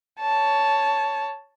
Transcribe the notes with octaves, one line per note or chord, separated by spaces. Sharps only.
C#5 A5